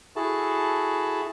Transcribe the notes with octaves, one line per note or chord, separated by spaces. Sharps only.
E4 F#4 G#4 A4 A5